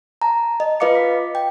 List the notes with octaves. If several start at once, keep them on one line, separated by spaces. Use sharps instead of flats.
A5 A#5
D#5
F4 B4 D#5 F5 D6 C#7
B6
G5